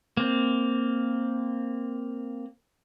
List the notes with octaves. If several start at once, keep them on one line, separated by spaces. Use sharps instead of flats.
A#3 C4